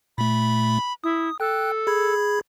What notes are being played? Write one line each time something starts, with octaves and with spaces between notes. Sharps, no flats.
A#2 A3 B5
E4 D#6
A4 G5 F#6
G#4 B5 G#6